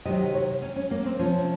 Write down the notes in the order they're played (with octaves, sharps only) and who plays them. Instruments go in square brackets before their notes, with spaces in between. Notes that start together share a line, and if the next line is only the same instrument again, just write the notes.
[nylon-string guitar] C3 D#3 F#3 D#5
D#5
C#5
C#4
C#4
A#3
C4
C3 F3 C#4